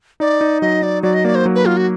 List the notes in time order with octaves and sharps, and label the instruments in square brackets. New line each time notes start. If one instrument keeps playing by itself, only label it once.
[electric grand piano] D#4 [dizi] D5
[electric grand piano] D#4
[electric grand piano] F#3 [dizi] D#5
[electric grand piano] D#4 [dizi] D5
[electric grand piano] F#3 [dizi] D5
[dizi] D#5
[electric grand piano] A#3 [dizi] D5
[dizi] C5
[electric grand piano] F#3
[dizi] B4
[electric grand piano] F#3 [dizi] F4
[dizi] F#4